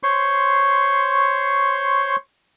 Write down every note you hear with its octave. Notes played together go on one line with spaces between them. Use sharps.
C5 C#5 C6 C#6